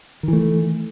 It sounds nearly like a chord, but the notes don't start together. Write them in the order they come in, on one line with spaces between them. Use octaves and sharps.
D#3 E3 A3